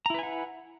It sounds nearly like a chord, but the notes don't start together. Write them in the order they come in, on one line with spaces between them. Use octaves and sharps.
A#5 E4 B4 G#5 F#5